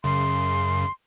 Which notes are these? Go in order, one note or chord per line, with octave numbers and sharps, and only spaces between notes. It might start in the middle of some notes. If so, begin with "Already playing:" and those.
F#2 C#3 C6